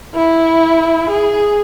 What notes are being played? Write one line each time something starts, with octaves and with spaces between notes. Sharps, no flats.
E4
G#4